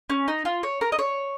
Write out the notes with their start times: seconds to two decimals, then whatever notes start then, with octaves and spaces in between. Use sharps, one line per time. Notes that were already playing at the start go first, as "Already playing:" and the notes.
0.10 C#4
0.28 D#4
0.45 F4
0.63 C#5
0.81 A#4
0.92 D#5
0.99 C#5